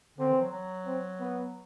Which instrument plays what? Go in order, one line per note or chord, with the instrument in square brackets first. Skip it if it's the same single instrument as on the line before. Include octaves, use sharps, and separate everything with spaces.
[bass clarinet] D3 [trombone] C4
[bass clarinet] E3
F#3
F#3
[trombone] C4
B3